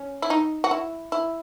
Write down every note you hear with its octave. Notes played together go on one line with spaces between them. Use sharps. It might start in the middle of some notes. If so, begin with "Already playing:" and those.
Already playing: C#4
E4
D#4
F#4
E4
E4